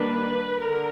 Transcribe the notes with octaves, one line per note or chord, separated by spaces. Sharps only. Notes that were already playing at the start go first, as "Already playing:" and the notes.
Already playing: D#3 G3 A#3 D4 B4
D3 A#4